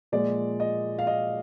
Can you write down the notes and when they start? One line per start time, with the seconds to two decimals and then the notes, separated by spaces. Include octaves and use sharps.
0.12 A#2 F3 G#3 D5
0.60 D#5
0.99 F5
1.07 D#5